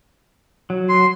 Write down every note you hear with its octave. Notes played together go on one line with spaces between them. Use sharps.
F#3
C6